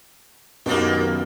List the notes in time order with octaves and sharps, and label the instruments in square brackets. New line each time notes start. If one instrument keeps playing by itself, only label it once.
[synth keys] F#2 B2 D#3 [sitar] A#3 B3 G4